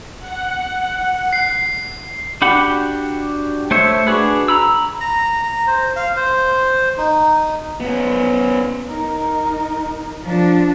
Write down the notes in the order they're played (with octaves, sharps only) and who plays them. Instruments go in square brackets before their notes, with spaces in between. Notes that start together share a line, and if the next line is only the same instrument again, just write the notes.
[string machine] F#5
[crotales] C7
[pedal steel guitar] D4 F#4 G4 F#5 B5
A3 C5 C#5 E5
D4 F#4 G#4 B4
A#5 B5 E6
[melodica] A#5
A#5
C5
F5
C5
D#4
[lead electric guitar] B3 C#4
[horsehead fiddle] D#4 A#4
[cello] F3 D4